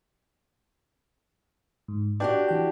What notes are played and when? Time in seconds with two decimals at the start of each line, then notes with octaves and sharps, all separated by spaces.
1.88 G#2
2.20 D4 F#4 G4 D5 G5
2.48 E3 G5